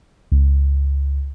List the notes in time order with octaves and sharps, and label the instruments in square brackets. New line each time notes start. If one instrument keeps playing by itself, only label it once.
[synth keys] C#2